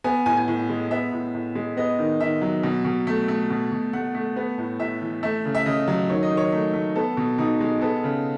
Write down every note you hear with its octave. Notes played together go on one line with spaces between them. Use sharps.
B3 G#5
A2 G#5
G#5
A2
G#3
B3 E5
A2
A2
G#3
B3 D#5
D#3
D#3 E5
F#3
B2
B2
A3
A3
B2
B2
A3 F#5
A3
B3
A2
A2 E5
E3
A3 E5
C#3
E5
C#3 D#5
F#3
D#3 C#5
D#5
D#3
C#5
A3
A3
B3 A4
B2
B2 D#4
G#3
B3 A4
C#3